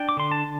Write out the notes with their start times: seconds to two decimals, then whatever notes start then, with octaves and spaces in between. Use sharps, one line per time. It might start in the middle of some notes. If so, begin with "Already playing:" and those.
Already playing: D4 G5
0.09 D6
0.17 D3 C6
0.32 A5